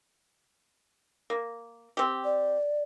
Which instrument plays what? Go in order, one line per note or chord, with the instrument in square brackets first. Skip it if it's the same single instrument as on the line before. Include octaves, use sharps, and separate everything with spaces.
[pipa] A#3
C4 G4
[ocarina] D5